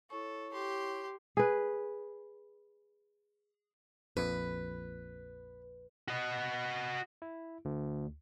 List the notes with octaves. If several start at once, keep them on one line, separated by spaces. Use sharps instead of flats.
E4 A4 C#5 C#6
G4 C6
G#4 B4
A#1 F2 B4
F#4 D#5
E4
D2